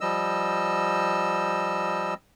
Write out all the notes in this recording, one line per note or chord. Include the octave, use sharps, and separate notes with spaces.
F3 G3 D#5 E6